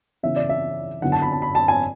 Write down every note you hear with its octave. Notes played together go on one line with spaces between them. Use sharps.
C#3 E3 B3 E4 E5
D5
E5
F#2 D3 F#3 B3 E4 F#5
A5
B5
A5
B5
A5
G#5